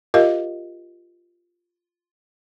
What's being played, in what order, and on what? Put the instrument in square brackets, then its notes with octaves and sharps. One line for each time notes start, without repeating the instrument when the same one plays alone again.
[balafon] F4 G4 A#4 D#5 F5